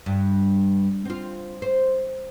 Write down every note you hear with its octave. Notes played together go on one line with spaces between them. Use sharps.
G2
C4 F4
C5